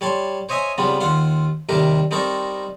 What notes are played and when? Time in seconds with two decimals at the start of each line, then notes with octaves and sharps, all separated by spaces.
0.01 G3 C#5 A5 C6
0.49 C5 C#5 D#5 E5 G#5
0.78 C#3 G3 B3 C4 F4
1.00 D#2 F4 F5 F#5 C6
1.69 D#2 C3 G3 G4 A#4
2.11 G3 C4 D#4 A#4 A5 C#6